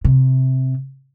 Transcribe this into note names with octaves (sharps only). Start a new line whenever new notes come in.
C3